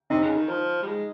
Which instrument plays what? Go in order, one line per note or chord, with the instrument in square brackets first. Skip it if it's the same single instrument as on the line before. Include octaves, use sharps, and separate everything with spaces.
[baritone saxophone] C3 [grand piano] D#4
[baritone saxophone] C#3
D#3
F3
G3
G#3